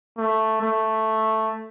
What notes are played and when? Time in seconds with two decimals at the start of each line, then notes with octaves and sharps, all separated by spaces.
0.18 A3
0.62 A3